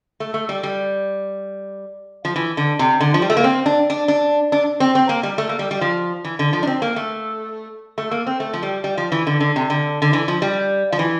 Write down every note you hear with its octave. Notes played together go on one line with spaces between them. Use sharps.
A3
A3
G3
G3
F3
E3
D3
C3
D3
F3
G3
A3
A#3
C4
D4
D4
D4
D4
C4
C4
A#3
G3
A3
A#3
G3
G3
F3
E3
D3
F3
D4
C4
A#3
A3
A3
A#3
C4
A3
F3
G3
G3
F3
E3
D3
D3
C3
D3
D3
E3
F3
G3
F3
E3